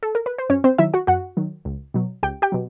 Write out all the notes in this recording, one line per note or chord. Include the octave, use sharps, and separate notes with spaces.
A4
A#4
B4
C5
F#2 C#4 C#5
C4 C5
D#3 F#3 E4 E5
F#4 F#5
F#2 F#4 F#5
D#3 F#3
C#2
B2 F#3
C#2 G4 G5
G4 G5
B2 F#3